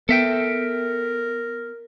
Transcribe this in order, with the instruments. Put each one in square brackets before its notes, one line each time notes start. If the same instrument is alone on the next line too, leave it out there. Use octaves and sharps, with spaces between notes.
[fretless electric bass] B3 [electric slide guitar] A4 E5 G5 [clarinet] A#4